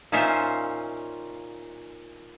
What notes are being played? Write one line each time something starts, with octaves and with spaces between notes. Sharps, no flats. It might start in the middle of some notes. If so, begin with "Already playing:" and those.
A#2 C#4 D#4 F4 C5 E5